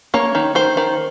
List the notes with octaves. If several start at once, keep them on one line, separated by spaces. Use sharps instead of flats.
A#3 C#5
D#3
D#3 C5
D#3